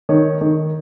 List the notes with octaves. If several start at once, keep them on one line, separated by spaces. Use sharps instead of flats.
D#3 C#5
D#3